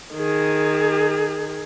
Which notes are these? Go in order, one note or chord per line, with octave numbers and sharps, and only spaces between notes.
D#3 G#4